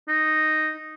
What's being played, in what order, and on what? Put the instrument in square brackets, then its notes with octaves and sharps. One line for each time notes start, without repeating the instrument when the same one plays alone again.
[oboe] D#4